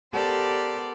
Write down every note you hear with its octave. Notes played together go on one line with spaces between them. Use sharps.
B3 G4 A4 A#4 C5 D5